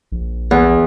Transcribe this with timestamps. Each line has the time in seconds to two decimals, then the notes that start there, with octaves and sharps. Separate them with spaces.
0.12 A#1
0.51 E2